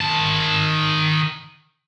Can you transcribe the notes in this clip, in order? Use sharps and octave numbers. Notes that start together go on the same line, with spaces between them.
D#3 A5